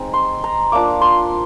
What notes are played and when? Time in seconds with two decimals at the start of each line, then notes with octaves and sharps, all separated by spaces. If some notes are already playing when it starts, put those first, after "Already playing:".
Already playing: G#3 C4 D#4
0.14 C6
0.44 A#5
0.72 A#3 D4 F4 D6
1.01 C6